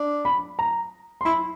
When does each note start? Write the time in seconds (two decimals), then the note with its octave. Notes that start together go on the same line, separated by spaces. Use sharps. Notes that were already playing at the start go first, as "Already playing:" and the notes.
Already playing: D4
0.25 B5
0.59 A#5
1.21 C6
1.25 E4 B5